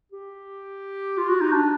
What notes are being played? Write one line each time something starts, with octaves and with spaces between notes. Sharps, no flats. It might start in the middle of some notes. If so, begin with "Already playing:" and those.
G4
F4
F#4
D#4
D4